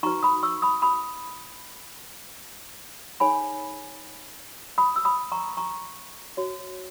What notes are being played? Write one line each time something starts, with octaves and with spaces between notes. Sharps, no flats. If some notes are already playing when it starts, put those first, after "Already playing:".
D#4 F#4 B4 A#5 C#6
B5 D#6
C#6 E6
B5 D#6
B5 D#6
D#4 G#4 C#5 G#5 B5
B5 D#6
E6
B5 D#6
A#5 C#6
A#5 C#6
F#4 C#5